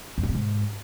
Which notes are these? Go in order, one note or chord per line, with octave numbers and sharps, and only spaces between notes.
F2
G2
C3
G#2